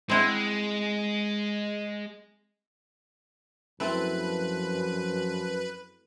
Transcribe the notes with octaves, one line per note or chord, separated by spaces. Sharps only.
G#3 C4 E4 F#5
F#2 F3 A3 C4 E4 B4